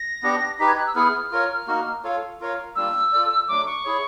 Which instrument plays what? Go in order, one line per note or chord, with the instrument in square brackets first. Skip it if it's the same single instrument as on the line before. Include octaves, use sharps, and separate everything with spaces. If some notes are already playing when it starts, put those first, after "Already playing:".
Already playing: [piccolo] A#6
[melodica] B3 D4 G4
[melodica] D#4 G4 B4 [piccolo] B6
[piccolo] G#6
F#6
E6
[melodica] B3 E4 G#4 B4 [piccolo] F6
[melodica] F4 A#4 C#5
A#3 D#4 F#4
F4 A4 C#5 F5
F4 A#4 C#5 F5
[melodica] G3 A#3 D4 F4 [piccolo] E6
[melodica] F4 A4 D5
[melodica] F#3 A3 D4 [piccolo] D6
[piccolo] C#6
[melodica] E4 G#4 C#5